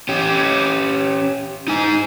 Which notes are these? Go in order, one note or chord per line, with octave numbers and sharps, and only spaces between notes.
C#4 G4
D#4 G#5